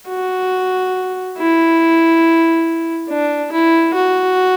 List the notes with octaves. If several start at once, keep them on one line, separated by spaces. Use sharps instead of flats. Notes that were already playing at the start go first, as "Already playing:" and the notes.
F#4
E4
D4
E4
F#4